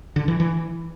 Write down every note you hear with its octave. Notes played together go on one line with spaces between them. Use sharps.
D3
E3
E3